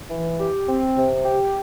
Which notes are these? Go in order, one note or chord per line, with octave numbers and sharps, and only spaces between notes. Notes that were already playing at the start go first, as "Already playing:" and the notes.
E3
G4
C4
C3
G4